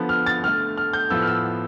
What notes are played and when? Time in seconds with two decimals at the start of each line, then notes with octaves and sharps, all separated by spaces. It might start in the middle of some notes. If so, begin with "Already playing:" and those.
Already playing: D3 F3 B3
0.09 F6
0.26 A6
0.44 D3 A3 F6
0.78 F6
0.93 G6
1.10 A2 F3 B3 E6
1.22 F6
1.27 E6